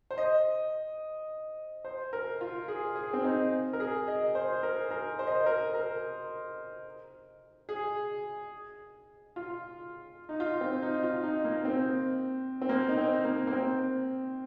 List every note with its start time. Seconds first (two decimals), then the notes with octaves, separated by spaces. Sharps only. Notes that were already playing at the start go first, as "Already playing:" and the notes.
0.11 C5
0.18 D#5
1.85 C5
2.13 A#4
2.41 F4
2.68 G#4
2.96 G#4
3.13 C4
3.24 D#4
3.73 A#4
3.80 G#4
4.08 D#5
4.35 C5
4.63 A#4
4.91 A#4
5.19 C5
5.27 D#5
5.35 C5
5.46 A#4
5.74 A#4
7.69 G#4
9.36 F4
10.29 D#4
10.40 F4
10.61 C4
10.82 D#4
11.03 F4
11.23 D#4
11.44 A#3
11.65 C4
12.62 C4
12.69 A#3
12.89 D#4
12.97 C4
13.25 A#3
13.47 A#3
13.53 C4